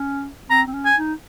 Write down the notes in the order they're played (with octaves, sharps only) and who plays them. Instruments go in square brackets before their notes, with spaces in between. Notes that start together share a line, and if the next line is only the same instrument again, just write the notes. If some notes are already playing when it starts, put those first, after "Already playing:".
Already playing: [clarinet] C#4
[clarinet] C4 [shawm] A#5
[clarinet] C4
C#4
[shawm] G#5
[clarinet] D#4